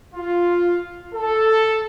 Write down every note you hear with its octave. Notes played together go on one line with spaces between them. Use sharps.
F4
A4